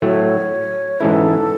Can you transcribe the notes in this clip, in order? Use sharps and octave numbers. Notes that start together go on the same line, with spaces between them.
A2 F#3 A3 C#5
G#2 E3 G#3 C#4 E4 A4